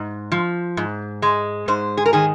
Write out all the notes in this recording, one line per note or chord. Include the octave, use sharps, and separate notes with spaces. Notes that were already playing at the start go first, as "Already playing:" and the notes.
Already playing: G#2
F3
G#2
G#3
G#2 C5
G#4
A#4
D#3 G#4